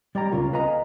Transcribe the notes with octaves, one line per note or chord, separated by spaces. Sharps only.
G3 D5 G5 A#5
C#2 C#3 F4 A#4
A4 B4 D#5 F5 G#5 A#5